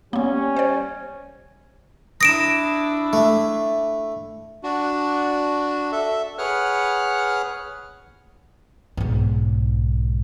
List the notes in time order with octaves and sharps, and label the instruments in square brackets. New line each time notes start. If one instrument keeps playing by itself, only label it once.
[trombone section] G3 C#4 [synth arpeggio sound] A#3 B3
[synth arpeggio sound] C5 D5
[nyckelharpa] D4 E4 [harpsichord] D#6 [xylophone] A#6 D7 E7
[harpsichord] A3
[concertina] D4 F#4
A4 E5
G#4 B4 C#5 F#5 F6 F#6
[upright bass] B1 G#2